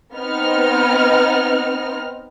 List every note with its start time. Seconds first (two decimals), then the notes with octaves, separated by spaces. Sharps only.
0.15 B3 C4 D#4 D#5 F6